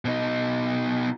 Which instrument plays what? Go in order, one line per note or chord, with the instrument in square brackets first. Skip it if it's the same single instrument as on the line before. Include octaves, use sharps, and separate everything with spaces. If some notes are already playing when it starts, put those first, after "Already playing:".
[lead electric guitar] B2 D#4